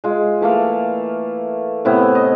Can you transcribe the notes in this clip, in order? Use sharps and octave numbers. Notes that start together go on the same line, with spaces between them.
G#3 F4
E3 A3 A#3 F5
A2 C3 B3 E4
D#5